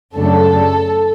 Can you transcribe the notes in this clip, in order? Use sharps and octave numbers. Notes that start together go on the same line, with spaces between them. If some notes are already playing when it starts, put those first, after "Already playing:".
F#2 C#3 F#3 A3 D4 A4